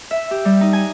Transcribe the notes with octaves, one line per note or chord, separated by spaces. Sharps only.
E5
G4
G3
D#4
G#5